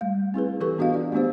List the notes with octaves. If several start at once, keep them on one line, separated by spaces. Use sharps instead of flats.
G3 A3 F5
C4 E4 G#4 B4
E3 G4 A4 B4 C#6
B3 D4 F#4 D#5 F5
F4 D5
A3 B3 D4 G4 C5